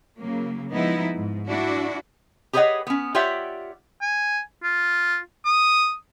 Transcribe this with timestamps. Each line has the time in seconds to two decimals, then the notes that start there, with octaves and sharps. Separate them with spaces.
0.19 C#3 F#3 A#3
0.73 F3 G#3 B3 D#4 E4
1.14 G#2
1.48 D4 E4 F#4
2.53 G4 G#4 B4 C#5 D#5 F#5
2.87 B3 C#4
3.15 F4 G4 C#5 D5 E5 F#5
4.01 G#5
4.63 F4
5.46 D#6